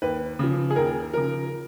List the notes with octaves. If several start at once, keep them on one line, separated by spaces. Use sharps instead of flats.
D#2 B4
C#3 F3
G#4
D#2 A#4
C#3 F3 A#4